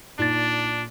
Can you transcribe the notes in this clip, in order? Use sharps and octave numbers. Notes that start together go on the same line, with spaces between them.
A#2 D4 D#4 A6